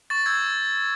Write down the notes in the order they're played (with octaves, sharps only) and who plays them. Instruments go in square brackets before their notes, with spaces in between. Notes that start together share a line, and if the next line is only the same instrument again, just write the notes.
[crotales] C#6 A6
E6 G6 G#6